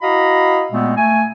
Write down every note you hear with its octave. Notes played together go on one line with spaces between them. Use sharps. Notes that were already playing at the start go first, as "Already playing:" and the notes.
E4 F#4 D#5 F5 A#5 B5
A#2 G#3 A3 B3 C4
A3 G#5